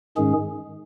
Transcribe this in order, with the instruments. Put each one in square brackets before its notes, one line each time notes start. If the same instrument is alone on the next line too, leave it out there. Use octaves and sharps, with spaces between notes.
[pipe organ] G#2 D#3 G#3 C#4 G#4